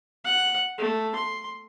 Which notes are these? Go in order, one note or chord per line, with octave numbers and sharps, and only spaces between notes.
F#5
A3
C6